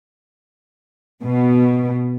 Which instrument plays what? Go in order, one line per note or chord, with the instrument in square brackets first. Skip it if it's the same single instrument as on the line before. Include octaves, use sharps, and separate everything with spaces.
[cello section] B2